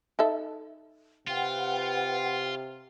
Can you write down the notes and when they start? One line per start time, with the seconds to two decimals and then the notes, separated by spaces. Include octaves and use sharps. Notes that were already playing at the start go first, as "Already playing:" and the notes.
0.19 D#4 A4 E5
1.27 C3 F4 B4 F#5 G5